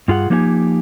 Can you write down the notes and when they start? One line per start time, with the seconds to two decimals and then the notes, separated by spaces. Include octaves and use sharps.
0.08 G2 F4 G#4 F#5
0.30 F3 A#3 D#4 G4 D5 G#5